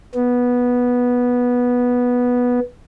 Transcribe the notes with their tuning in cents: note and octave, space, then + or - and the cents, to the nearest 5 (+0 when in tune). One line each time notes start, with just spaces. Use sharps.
B3 -10